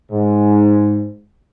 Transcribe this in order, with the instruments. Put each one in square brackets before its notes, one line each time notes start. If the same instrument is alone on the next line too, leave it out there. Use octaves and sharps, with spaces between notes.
[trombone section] G#2